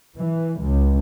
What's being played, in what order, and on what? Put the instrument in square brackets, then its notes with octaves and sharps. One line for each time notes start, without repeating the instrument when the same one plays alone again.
[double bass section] E3
C#2